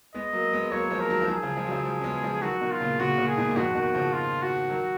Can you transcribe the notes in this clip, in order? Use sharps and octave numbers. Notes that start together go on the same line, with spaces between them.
G#3 B3 D#5
F#3 A#3
G#3 B3
F#3 A#3 C#5
A#3
F3 G#3
A#4
D#3 F#3
F3
D#3 F#3 G#4
C#3 F3
F3 G#3
F#3
C#3 F3
F3 G#3
C#4
G#3 B3
F3 G#3
D#3 F#3 F#4
B2 D#3
F4
A#2 C#3
A#2 C#3 F#4
A#2 C#3
G#4
G#2 B2
A#2
F2 G#2 F#4
B2 D#3
C#3 F3
F4
F#4
D#3 F#3